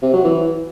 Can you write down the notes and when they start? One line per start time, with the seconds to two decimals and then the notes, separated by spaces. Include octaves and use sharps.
0.02 C3
0.13 F#3
0.24 E3